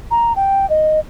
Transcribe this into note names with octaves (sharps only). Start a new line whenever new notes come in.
A#5
G5
D#5